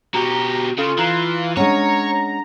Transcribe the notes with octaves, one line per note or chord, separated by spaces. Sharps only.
B2 F#4 G4 A#5 C#6 C#7
C#3 F4 A4
E3 A#5 F#6 C7
G#3 C#4 D4 C#5 F#5 A#5